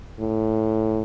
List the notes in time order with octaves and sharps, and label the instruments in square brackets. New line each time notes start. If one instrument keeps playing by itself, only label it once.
[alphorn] A2